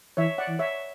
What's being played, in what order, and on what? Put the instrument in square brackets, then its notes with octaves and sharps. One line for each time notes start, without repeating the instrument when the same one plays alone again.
[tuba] E3 [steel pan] C#5 E5
[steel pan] D5 F#5
[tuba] E3
[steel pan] C#5 E5